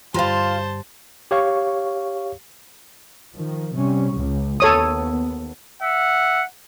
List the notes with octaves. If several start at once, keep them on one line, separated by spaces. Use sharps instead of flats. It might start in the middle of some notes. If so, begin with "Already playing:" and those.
G2 D3 G3 F4 C5 F5 A5
G4 C#5 F5 C#6
D#3 F3
C3 G3 C#4
C#2 C#3
D#2 B3 A4 C#5 D#6
E5 F#5